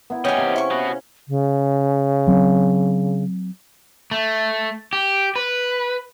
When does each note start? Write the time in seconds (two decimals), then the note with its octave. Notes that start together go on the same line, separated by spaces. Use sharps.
0.10 B3 E4
0.25 C#4 G4 D#5 G5 G#5
0.38 C3 F5
0.56 E4 C#6
0.71 B3 F#4
1.28 C#3
2.28 F#3 C4
4.11 A3
4.93 G4
5.36 B4